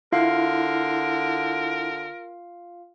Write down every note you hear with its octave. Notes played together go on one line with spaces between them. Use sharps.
D3 E4 F4 A#4 F5